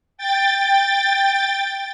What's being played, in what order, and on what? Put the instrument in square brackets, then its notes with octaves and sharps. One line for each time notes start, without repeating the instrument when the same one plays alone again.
[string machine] G5 A6